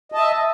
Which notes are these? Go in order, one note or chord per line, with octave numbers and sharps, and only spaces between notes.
D#5 E5 A5